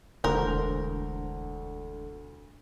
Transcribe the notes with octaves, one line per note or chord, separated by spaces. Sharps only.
E1 D2 A#4 C5